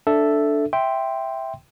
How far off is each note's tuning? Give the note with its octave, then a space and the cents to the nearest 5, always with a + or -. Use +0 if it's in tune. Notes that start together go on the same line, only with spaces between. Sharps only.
D4 +0 A4 +0 E5 +0
E5 +0 G5 +0 C6 +0